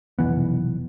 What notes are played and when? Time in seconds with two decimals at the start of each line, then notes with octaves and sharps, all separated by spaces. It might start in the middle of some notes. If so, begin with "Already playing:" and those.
0.19 F1 B1 E3 B3